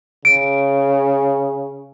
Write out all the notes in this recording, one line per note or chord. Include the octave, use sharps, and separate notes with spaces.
C#3 D7